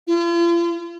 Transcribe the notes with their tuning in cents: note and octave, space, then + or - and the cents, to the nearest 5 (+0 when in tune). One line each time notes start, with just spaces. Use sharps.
F4 -45